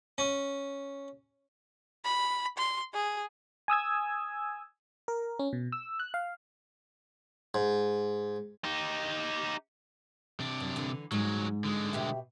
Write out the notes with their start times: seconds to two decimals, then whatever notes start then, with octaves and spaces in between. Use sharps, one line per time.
0.18 C#4
2.05 B5
2.58 C6
2.94 G#4
3.68 G#5 D#6 E6 G#6
5.08 A#4
5.39 C#4
5.53 B2
5.72 E6
6.00 F#6
6.14 F5
7.54 G#2
8.64 D#4 G4
10.40 C3 D4
10.60 F#2
10.76 D3 E3
11.12 G#2 F#3 G#3
11.64 D3 G#3
11.93 B2 G4 E5